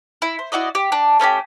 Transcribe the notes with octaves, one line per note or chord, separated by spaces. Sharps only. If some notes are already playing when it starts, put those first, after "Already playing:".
E4
C5
E4 F#4 D5 D#5
G4
D4
A3 C#4 D#4 G4